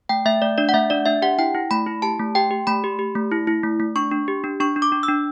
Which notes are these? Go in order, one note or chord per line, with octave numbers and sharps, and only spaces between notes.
A3 G5
A3 E5
A3 D5
D4 D5
F#5
A3 E5
D4 D5
D4 E5
G4 F#5
E4 G5
E4
A3 B5
E4
G4 A5
A3
G4 G5
G4
A3 B5
G4
G4
A3
E4
E4
A3
A3
D4 C#6
D4
G4
D4
D4 C#6
D4
D6
D4
E6
D4